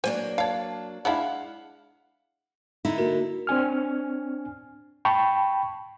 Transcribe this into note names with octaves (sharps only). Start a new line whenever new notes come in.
F#3 A#3 D4 C5 C#5 G#5
C#5 F5 A5
G#3 D4 E4 F5 F#5
D3 D#4 E4
A#3 F#4 A#4
C4 D4 G#5 F6
G5 A5 B5 C#6